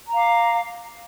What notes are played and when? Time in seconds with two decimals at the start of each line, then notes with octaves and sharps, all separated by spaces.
0.08 A#5
0.12 F5
0.16 D6